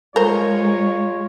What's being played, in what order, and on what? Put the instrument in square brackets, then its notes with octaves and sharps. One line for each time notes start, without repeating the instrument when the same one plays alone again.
[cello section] G#3 [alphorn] F4 [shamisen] A#4 C5 [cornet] C#5